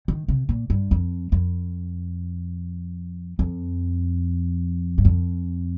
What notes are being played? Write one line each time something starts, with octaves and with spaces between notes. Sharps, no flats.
D#3
C3
A#2
G2
F2
F2
F2
G2
F2